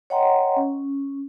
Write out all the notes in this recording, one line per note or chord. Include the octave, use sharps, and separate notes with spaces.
C#5 D#5 F#5 G5 A#5 C6
C#4